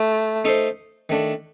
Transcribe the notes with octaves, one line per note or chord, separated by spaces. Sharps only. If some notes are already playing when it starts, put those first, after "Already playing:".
Already playing: A3
A3 D#4 A4 C5
D#3 A3 D4